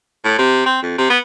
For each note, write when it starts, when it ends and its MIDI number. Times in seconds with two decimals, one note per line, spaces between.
0.24 0.36 45
0.38 0.63 48
0.66 0.80 60
0.82 0.93 41
0.98 1.06 48
1.10 1.18 59